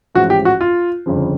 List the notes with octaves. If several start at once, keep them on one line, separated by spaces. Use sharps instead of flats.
A1 G#2 F3 F#4
G4
F#4
F4
G1 F2 C#3 F3